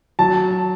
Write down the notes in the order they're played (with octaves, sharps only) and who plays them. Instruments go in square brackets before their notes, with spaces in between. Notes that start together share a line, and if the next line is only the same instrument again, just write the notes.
[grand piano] F#3 A5